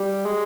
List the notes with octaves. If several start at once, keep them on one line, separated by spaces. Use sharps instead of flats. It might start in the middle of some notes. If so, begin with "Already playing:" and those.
Already playing: G3
G#3